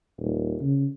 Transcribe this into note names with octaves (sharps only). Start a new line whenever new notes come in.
D#1
C#3